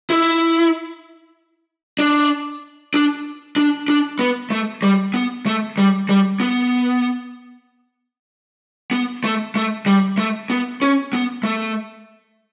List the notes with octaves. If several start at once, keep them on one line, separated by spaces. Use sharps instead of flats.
E4
D4
D4
D4
D4
B3
A3
G3
B3
A3
G3
G3
B3
B3
A3
A3
G3
A3
B3
C#4
B3
A3